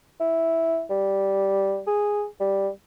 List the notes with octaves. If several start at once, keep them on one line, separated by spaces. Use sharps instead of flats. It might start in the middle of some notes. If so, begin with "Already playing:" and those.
E4
G3
G#4
G3